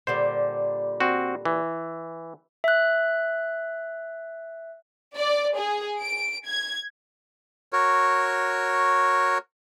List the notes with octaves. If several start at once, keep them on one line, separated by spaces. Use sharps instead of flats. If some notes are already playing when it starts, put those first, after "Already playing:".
A#2 D3 G3 C5
C4 F#4
E3
E5 F#6
D5
G#4
D7
G#6
F#4 A#4 C#5